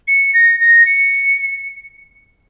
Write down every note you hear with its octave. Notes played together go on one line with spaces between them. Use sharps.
C#7
A#6
A#6
C#7